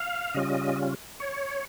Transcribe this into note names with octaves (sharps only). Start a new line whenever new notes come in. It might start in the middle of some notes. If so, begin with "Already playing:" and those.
Already playing: F5
C#3 G3 C#4 F4 D#5
C#5